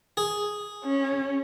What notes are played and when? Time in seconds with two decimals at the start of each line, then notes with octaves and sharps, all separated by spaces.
0.17 G#4
0.84 C#4